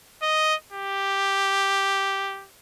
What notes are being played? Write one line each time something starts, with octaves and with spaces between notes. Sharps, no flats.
D#5
G4